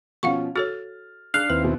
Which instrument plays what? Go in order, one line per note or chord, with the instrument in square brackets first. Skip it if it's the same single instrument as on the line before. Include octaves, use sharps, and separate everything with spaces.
[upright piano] B2 F3 C#4 [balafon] F5 F#5 C#6
[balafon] F#4 A4 C#5 [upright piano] F6 A6
[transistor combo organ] D4 [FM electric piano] F5 [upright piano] F#6
[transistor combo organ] D#2 C4 E4 [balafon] B4
[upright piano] B2